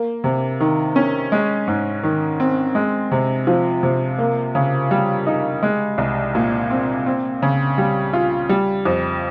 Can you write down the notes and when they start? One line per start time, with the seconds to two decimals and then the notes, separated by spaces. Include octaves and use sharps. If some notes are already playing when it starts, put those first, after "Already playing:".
Already playing: A#3
0.24 C3
0.60 D#3
0.96 C#4
1.32 G#3
1.67 G#2
2.04 D#3
2.40 C4
2.75 G#3
3.12 C3
3.47 F3
3.83 C3
4.18 A#3
4.55 C#3
4.91 G3
5.27 D#4
5.63 G#3
5.98 C2
6.35 A#2
6.70 C4
7.06 C4
7.42 C#3
7.78 G3
8.13 F4
8.49 G3
8.85 F2